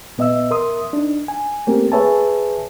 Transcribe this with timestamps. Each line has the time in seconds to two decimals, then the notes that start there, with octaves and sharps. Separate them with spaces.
0.18 A#2 B3 D#5 E5 E6
0.51 A#4 E5 C6 D#6
0.93 D4 D#4
1.28 G#5
1.67 A3 A#3 C4 C#4 G4 A#4
1.92 G#4 B4 C#5 E5 G#5 A5